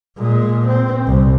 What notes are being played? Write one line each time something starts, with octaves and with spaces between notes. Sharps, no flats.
A#2 G#3
C4
C2